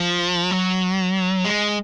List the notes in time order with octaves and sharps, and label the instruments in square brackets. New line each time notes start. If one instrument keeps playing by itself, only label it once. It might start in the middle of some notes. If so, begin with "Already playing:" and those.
Already playing: [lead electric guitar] F3
F#3
G#3